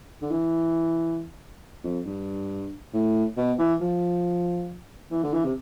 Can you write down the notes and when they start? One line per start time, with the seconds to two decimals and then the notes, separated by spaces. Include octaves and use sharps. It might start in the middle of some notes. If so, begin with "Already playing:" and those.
0.22 D3
0.31 E3
1.84 F2
2.06 G2
2.94 A2
3.37 B2
3.59 E3
3.81 F3
5.11 E3
5.23 D3
5.33 E3
5.44 C3